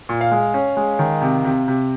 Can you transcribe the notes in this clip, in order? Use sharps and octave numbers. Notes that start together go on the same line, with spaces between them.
A#2
F5
G#3
C#4
G#3
D#3
C3
C3
C3